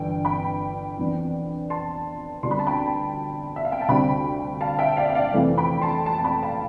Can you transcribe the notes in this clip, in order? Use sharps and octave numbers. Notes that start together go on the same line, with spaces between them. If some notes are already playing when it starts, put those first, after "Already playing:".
Already playing: G1 G2 E3 G5
G5 B5
F2 E3 B3 D4
A5 C6
D2 D3 G3 B3 D4 C6
B5
A5
G5 B5
E5
F5
G5
A5
D2 C3 G3 C4 G5 B5
F5 A5
E5 G5
D5 F5
E5
D5 F5
F2 C3 E3 A3
G5 B5
A5 C6
A5 C6
A5
G5 B5
F5 A5